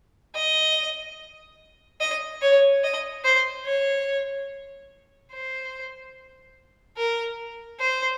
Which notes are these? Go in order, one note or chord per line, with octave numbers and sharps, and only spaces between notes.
D#5
D#5
C#5
D#5
C5
C#5
C5
A#4
C5